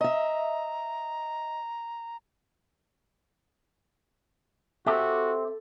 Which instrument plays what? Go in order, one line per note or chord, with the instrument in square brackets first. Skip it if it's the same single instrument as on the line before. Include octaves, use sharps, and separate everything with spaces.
[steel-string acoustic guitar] D#5 E5 [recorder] A#5
[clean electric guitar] C4 G4 [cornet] F#4 [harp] A4 [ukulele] E5